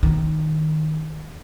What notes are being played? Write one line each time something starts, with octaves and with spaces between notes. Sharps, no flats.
D#3